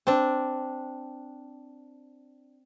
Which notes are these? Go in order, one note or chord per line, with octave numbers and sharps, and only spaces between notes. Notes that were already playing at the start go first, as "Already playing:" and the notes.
C4 D4